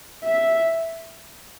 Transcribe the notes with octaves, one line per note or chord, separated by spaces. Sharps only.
E5